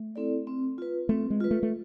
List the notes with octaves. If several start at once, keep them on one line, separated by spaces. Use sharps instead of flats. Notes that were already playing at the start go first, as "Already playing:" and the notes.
Already playing: A3
C4 E4 A4 D5
C4
F4 B4
A3 C4
G#3
F4 B4
A3
A3